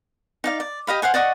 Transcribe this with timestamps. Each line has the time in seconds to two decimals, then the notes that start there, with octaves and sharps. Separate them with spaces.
0.44 D#4 D5 F5
0.60 D5
0.87 G4 D#5 F5 B5
1.02 C5 F5 F#5 G#5
1.14 D5 D#5 F#5 C#6